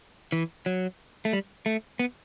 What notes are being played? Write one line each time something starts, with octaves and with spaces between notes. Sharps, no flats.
E3
F#3
A3
G3
A3
B3